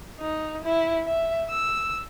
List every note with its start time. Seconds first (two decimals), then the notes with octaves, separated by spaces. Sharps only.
0.21 D#4
0.64 E4
1.06 E5
1.50 E6